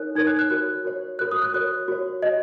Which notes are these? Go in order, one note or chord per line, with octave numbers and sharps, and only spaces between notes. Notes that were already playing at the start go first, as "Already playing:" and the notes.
Already playing: D#4 A#4 C#5 F#6
D#4 A#4 C#5 G#6
F#6
F#6
F#4 A#4 C#5 F#6
F#4 A#4 C#5
F#4 A#4 C#5 F#6
D#6
F#6
F#4 A#4 C#5 F#6
F#4 C#5
F#4 C#5 D#5